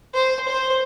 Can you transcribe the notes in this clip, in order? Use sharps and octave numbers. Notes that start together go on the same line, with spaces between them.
C5
C5